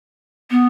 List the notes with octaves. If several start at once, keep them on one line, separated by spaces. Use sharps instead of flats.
B3